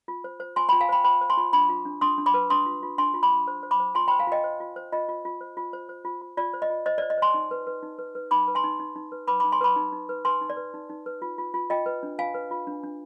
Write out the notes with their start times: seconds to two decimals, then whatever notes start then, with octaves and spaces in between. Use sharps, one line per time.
0.08 F4
0.24 C5
0.40 C5
0.56 F4 G#5 C6
0.69 F4 G5 B5
0.81 F5 G#5
0.89 C5 G5 B5
1.04 C5 G5 B5
1.21 C5
1.30 G#5 C6
1.37 F4
1.53 D4 B5 D6
1.69 F4
1.86 D4
2.01 D4 C6 D#6
2.18 D4
2.26 B5 D6
2.34 B4
2.50 D4 C6 D#6
2.66 F4
2.83 F4
2.98 D4 G#5 C6
3.14 F4
3.23 B5 D6
3.31 F4
3.47 C5
3.63 C5
3.71 B5 D6
3.80 C5
3.95 F4 G#5 C6
4.08 C5 G5 B5
4.19 F5 G#5
4.27 F4 D#5 G5
4.44 C5
4.60 F4
4.76 C5
4.92 F4 D#5
5.09 F4
5.25 F4
5.41 C5
5.57 F4
5.73 C5
5.89 C5
6.05 F4
6.21 F4
6.37 F4 D5
6.53 C5
6.62 D#5
6.70 F4
6.86 C5 D#5
6.98 C5 D5
7.10 D#5
7.18 C5 G#5 C6
7.34 D#4
7.51 B4
7.67 B4
7.83 D#4
7.99 B4
8.15 B4
8.31 D#4 B5 D6
8.48 B4
8.55 G#5 C6
8.64 D#4
8.79 D#4
8.96 D#4
9.12 B4
9.27 B4 B5 D6
9.40 D#4 B5 D6
9.52 G#5 C6
9.61 B4 B5 D6
9.76 D#4
9.92 D#4
10.09 B4
10.25 B4 G#5 C6
10.41 D#4
10.50 D5
10.57 B4
10.74 D#4
10.89 D#4
11.06 B4
11.22 F4
11.38 F4
11.54 F4
11.70 F4 D#5 G5
11.86 B4
12.03 D4
12.18 F4 F5 G#5
12.35 B4
12.51 F4
12.67 D4
12.83 D4